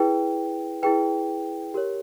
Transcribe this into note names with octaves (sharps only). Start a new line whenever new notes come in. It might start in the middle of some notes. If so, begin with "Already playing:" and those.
Already playing: E4 G#4 B4 G5
E4 G#4 B4 G5
G4 A#4 C#5